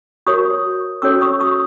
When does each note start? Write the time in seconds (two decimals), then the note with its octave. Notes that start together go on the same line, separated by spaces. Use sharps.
0.27 F#4 A#4 C#5 C#6 D#6
1.02 C#4 F#4 A4 C#5 D6 E6
1.21 C#6 D#6
1.40 C#6 D#6